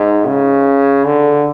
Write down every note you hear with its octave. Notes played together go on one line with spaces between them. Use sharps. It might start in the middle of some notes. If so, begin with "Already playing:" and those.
Already playing: G#2
C#3
D3